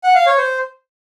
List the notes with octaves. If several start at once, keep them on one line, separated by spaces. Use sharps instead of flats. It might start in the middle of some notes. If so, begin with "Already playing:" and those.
F#5
F5
C#5
C5